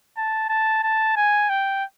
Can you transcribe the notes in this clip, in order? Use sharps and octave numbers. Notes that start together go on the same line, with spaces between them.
A5
A5
A5
G#5
G5